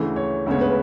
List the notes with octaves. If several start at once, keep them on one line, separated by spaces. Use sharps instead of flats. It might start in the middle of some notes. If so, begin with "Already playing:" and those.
Already playing: D2 C#3 E3 A3
C#5
D2 C#3 G#3 B3 C#5
B4